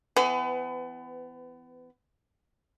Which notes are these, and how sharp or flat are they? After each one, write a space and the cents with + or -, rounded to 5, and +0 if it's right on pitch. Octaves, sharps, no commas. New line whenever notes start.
E3 +20 B3 +30 B4 +35